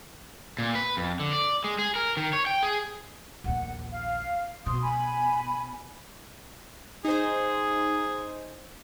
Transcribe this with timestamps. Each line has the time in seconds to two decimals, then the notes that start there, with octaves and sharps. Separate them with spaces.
0.58 A#2
0.75 B4
0.97 F2
1.20 D3
1.33 D5
1.64 G#3
1.79 G#4
1.96 A#4
2.17 D#3
2.33 C#5
2.46 G5
2.63 G#4
3.44 A#1 D#2 F#5
3.92 F5
4.66 B2 C6 D#6
4.82 G#5 B5
7.05 D#4 G#4 C5